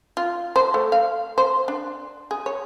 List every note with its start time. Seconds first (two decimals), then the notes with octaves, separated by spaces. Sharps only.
0.17 F4
0.56 C5
0.74 A3
0.92 F5
1.38 C5
1.68 D4
2.31 G#4
2.46 C#5